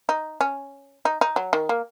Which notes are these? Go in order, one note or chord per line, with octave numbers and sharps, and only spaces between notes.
D#4
C#4
D#4
D#4
F#3
D#3
A#3